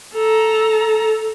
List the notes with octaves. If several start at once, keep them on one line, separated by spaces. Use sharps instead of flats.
A4 A#5